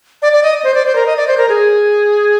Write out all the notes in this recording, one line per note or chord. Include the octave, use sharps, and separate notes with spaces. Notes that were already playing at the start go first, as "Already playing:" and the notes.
D5
D5
D#5
C5
D5
C5
A#4
D#5
D5
C5
A#4
G#4